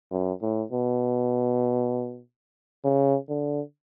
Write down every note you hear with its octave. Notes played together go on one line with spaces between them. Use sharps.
F#2
A2
B2
C#3
D3